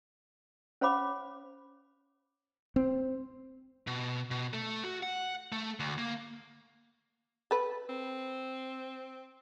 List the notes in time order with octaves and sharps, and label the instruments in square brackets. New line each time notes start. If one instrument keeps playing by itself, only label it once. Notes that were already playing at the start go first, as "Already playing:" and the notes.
[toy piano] C#4 C5 C#5 F5 B5 D6
[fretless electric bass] C4
[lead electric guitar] B2
B2
A3
F#4
F#5
A3
D2
A#3
[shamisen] A4 B4
[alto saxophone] C4